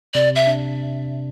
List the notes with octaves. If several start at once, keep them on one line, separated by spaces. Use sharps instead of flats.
C3 D5
E5
D4